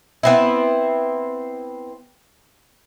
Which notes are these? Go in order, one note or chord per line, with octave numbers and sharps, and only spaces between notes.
B3 C4 E4